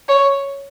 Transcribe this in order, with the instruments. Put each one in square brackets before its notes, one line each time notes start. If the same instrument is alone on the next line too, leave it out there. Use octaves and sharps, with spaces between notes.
[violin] C#5